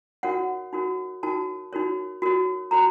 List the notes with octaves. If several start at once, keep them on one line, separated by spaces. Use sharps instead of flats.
D#4 F#4 A#4 C#5 F#5
D#4 F#4 A#4 C#5
D#4 F#4 A#4 C#5 A5
D#4 F#4 A#4 C#5
F#4 A#4 C#5
F#4 A#4 C#5 A#5